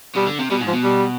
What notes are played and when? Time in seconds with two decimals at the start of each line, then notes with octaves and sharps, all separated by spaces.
0.16 B2 G3
0.27 D3
0.39 C3
0.50 B2 G3
0.61 G#2
0.67 F3
0.73 B2
0.84 G3